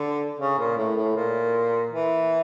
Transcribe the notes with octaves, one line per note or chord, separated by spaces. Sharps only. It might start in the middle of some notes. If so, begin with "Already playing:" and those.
Already playing: D3
C#3
A#2
A2
A2
A#2
E3